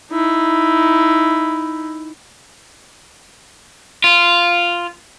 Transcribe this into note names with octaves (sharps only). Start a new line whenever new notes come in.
D#4 E4
F4